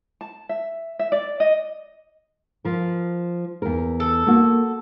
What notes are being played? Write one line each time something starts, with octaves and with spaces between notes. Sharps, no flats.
A5
E5
E5
D5
D#5
F3 A#4
E2 A#4
A4
A#3 F#4